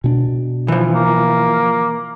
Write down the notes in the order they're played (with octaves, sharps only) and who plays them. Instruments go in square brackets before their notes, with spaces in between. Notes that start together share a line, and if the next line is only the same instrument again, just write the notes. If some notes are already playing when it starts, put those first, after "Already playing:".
[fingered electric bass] B2 C#4 D4
[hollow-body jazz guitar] E3 F3
[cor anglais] A#3